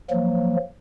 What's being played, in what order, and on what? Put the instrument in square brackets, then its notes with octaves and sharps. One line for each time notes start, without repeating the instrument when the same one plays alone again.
[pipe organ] F3 F#3 A#3